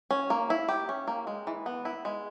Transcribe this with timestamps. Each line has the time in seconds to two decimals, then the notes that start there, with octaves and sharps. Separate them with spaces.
0.11 C#4
0.30 A#3
0.50 E4
0.69 G4
0.89 C#4
1.07 A#3
1.27 G#3
1.47 E3
1.66 B3
1.85 E4
2.05 G#3